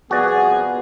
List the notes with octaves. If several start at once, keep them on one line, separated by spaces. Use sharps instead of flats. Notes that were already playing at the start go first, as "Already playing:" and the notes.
C2 F3 B3 F#4 G#4 D5